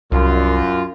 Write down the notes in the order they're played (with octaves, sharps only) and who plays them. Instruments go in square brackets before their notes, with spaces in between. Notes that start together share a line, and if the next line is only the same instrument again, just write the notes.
[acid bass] C2 [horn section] F#2 F4